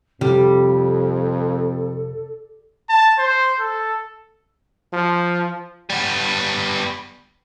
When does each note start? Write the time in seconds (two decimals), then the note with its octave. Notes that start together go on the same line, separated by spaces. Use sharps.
0.21 F2 C3 G3 A4
2.89 A5
3.19 C5
3.60 A4
4.93 F3
5.90 G3 B3